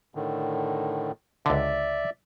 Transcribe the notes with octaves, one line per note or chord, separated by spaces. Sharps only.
A2 D3 D#3
C#2 D3 D5 E5